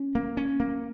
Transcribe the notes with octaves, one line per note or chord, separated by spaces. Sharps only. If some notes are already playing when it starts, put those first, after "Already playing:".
Already playing: C#4
A#3
C#4
A#3